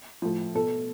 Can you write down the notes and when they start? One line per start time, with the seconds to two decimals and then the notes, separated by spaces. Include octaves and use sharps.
0.22 A2 F3
0.55 B2 A4